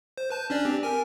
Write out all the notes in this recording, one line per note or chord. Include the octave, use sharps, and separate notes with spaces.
C5
B4 A5 G6
C#4 D4 D5
C4 G4
A#4 G#5